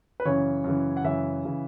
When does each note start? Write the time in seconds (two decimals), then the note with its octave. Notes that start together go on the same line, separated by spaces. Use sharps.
0.20 B4
0.25 F#2 C#3 E3 C#5
0.64 F#2 C#3 E3
0.97 F#5
1.04 F#2 C#3 E3 E5
1.45 C#3 E3